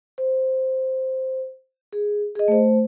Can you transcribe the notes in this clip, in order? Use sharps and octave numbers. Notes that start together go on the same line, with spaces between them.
C5
G#4
G#4 D#5
A3 C5